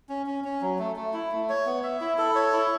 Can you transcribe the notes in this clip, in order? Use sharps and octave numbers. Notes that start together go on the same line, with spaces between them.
C#4
C#4
C#4
F#3
A3
A3
E4
A3
C#5
B3
E5
E4
A4
C#5
E4